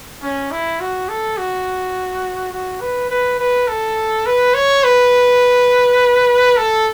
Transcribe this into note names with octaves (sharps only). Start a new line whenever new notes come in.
C#4
E4
F#4
A4
F#4
F#4
B4
B4
B4
A4
B4
C#5
B4
A4